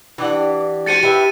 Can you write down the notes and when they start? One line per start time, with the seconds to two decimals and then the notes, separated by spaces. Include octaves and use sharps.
0.18 E3 D4 G4 F#5
0.86 G#3 F#4 C5 A6 C#7 D#7
1.03 A2 G4 B4 E5